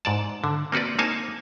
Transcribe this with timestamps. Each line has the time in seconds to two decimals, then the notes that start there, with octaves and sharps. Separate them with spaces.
0.05 G#2 D5 A5
0.44 D3
0.72 A#3 C4 F#4 B4 D5
0.99 A#3 D#4 C5 C#5 G#5 A5